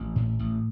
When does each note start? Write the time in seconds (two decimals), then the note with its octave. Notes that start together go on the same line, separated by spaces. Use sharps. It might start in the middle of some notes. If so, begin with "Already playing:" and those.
Already playing: A1 A#3
0.16 A2
0.39 A1